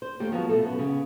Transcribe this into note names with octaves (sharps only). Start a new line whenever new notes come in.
C5
D#2 A3 G4
F3 F#3 G#3 B3
B2 A3 A4
F#2 B3
C#3 B3